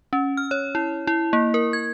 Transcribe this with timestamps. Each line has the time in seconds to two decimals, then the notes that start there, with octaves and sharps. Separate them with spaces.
0.13 C#4
0.37 F6
0.51 C#5
0.75 E4
1.07 E4
1.33 A#3
1.54 A#4
1.73 G#6